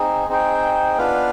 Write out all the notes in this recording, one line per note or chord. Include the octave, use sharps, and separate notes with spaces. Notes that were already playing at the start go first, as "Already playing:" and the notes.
Already playing: C4 D#4 G#4
C4 D#4 G#4 C5 G5
B3 D4 F4 B4 F5